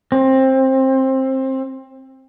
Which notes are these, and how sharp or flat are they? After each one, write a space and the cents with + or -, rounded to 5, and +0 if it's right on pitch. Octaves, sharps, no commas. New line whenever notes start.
C4 +20